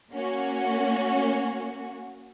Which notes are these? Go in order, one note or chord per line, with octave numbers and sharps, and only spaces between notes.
A#3 C#4 F#4